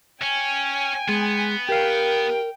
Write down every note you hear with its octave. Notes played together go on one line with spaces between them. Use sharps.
C#4 G5 G#5
G#3 B3
G4 A#4 F5 G5